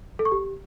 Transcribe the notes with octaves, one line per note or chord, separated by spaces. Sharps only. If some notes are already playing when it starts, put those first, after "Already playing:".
A4
C#6
G4